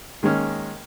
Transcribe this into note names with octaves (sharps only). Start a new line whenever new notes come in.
D#3 G#3 A#3 C#4